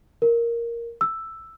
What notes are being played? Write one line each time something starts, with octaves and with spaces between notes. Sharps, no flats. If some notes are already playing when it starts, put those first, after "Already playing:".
A#4
E6